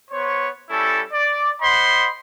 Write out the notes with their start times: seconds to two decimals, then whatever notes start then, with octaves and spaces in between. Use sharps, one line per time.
0.11 B3 C5 C#5
0.70 G3 C#4 E4 A4
1.12 D5
1.61 C5 D#5 F#5 B5 C6